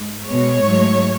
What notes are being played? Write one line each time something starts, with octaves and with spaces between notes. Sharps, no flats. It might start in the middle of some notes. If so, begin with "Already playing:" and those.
Already playing: G#2
B2 G#3 C#5
G#2 F#3 A3